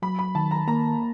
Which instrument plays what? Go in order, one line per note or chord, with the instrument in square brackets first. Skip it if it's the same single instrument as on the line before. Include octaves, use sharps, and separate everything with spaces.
[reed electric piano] F#3 [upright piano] B5
[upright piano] B5
[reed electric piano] D#3 [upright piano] A5
[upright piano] A#5
[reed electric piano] A#3 [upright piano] A#5